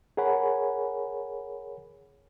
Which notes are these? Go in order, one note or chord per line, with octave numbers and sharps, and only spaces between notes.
G#4 A#4 C#5 F#5 G#5 B5